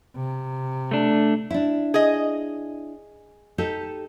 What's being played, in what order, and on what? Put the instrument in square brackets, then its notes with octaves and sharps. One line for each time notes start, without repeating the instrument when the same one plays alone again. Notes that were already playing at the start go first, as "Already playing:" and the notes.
[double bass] C3
[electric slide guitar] A3 D4
[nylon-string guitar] D4 E4
[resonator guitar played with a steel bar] G#4 D#5
[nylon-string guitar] D#4 G4 A4